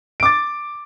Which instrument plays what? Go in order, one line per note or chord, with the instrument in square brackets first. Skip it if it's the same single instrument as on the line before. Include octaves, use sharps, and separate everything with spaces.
[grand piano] D7
D6
A6